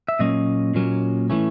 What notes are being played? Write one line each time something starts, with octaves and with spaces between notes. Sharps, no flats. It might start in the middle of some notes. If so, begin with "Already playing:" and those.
E5
A#2 F#3 A#3 C#4 D#5
A#2 F#3 A#3 C#4
A2 E3 A3 C#4